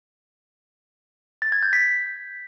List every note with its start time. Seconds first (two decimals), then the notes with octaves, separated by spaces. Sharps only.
1.42 A6
1.52 G#6
1.63 G6
1.73 B6